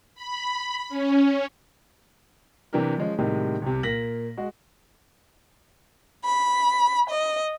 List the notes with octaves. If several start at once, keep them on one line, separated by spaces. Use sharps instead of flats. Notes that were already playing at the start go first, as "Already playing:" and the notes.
B5
C#4
C3 E3 D4 G4 A#4
F3 G#3 C#4
A2 C3 D#3 G3 G#3
C2 C3
A#2 A#3 A#6 B6 F#7
G#3 F#4
B5
D#5